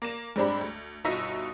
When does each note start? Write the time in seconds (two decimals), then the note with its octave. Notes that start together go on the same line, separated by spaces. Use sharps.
0.02 A#3 A#6 E7
0.36 G#2 G3 C4 D4 G4 B5
0.61 D2
1.04 G1 B2 D#4 F4 E5 A#6